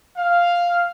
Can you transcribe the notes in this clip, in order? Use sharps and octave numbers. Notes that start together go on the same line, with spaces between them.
F5